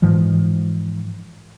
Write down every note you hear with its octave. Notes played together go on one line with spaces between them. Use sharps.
G#2 E3 F3 G#3